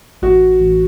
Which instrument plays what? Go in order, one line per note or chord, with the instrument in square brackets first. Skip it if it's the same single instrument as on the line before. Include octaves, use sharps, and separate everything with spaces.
[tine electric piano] A1 [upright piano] F#4
[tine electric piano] A1